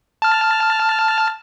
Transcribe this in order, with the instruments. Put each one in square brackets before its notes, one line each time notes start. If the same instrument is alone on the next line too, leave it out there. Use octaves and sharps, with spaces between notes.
[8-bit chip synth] A5 F6